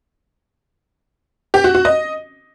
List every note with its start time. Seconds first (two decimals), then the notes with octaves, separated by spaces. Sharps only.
1.54 G4
1.64 F#4
1.75 F#4
1.85 D#5